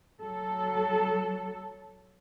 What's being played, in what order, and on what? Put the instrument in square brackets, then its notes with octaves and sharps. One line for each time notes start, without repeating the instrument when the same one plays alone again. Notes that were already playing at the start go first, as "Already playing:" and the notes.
[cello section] F#3 A4